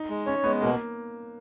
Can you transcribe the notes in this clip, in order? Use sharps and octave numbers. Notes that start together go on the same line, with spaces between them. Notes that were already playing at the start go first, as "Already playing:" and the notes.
Already playing: D#4
G#3
C#4 C#5
G#3 B3
B2 A#3